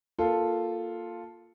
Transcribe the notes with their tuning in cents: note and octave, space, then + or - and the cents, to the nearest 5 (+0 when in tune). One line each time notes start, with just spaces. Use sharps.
A#3 +0 F4 +0 A4 +0